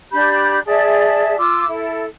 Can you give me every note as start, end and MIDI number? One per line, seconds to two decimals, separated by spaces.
0.12 0.58 62
0.12 0.58 67
0.12 0.58 83
0.12 0.58 91
0.66 1.36 68
0.66 1.36 74
0.66 1.36 76
0.66 1.36 81
1.37 1.67 65
1.37 1.67 86
1.37 1.67 88
1.68 2.04 64
1.68 2.04 69